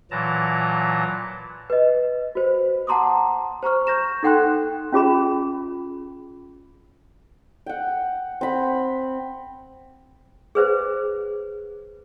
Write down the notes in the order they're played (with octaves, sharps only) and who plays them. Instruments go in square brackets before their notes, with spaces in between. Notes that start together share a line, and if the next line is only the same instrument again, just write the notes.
[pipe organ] A#2 E3 F#3 A5 A#5
[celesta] B4 D#5
F#4 C5
F#5 A5 A#5 C6 D6 D#6
C5 A#5 C#6 F6
C#6 G6 A#6 E7
D#4 A4 F#5 G5 C6 F#6
[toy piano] C#4 F4 G#4 B5
[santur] F#5 G5
C4 B5
[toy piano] G#4 B4 C5